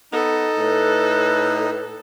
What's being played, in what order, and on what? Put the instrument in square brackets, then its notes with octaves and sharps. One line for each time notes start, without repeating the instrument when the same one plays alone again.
[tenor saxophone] B3 [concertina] D#4 [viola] A4
[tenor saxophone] A2 [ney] B4